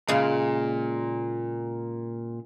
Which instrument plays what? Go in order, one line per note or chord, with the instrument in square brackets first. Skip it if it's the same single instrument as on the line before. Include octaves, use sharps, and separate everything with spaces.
[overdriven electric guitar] A#2 [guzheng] C#3 G#3